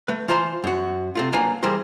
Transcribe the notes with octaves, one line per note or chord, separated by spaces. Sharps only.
A3 B4
E3 F4 C5 A5 A#5 C6
F#2 F#4
C3 A3 F4
F#3 A#3 D4 B4 G#5 A#5
E3 G3 G#4 A#4 C5